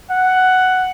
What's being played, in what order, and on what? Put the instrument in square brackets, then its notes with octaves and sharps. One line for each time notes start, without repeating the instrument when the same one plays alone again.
[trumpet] F#5